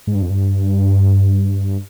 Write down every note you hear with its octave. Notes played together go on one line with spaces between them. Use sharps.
G#2
G2
F2
G2